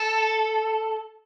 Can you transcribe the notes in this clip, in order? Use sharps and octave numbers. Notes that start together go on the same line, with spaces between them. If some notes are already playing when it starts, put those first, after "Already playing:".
Already playing: A4